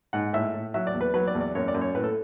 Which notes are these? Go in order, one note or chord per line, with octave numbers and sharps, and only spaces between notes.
G#2 F#5
A2 E5
A2
F#3 E5
D5
E2
B4
F#3 B4
D5
E2
D5
F#2 C#5
D5
F#2
C#5
A2 B4
A4